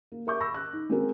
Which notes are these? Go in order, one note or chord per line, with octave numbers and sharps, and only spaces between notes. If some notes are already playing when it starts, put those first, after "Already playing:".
A#3
A#4 E5 C#6 D6 G6
B5 C#6 E6 A#6
F#6
D#4
G#3 C4 F#4 G#4 A#4